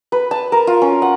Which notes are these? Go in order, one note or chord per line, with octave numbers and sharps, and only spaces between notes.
B4
A5
A#4
F4
C#4
F#5